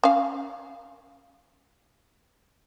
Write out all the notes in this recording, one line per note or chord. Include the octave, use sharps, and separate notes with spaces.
C#4 F5